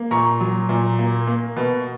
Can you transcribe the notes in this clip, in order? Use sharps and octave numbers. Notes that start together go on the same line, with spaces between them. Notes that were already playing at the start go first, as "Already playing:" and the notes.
Already playing: A#3
A#2 A#5 C#6
F#3
A#2
A#3
A#3
B2